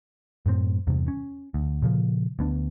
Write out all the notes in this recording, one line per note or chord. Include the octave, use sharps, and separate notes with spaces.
F#2 A2 A3 C4
E2 G2 C3
C#4
D2
A#2 C#3 F3
D2 B3 D4